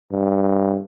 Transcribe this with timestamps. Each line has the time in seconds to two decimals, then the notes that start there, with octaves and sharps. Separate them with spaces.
0.12 G2